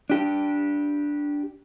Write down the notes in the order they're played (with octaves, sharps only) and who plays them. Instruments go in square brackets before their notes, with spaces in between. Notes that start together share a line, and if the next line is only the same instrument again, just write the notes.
[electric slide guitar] D4 G4